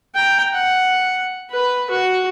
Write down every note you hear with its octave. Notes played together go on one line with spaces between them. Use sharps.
G5 A#5
F#5
B4
F#4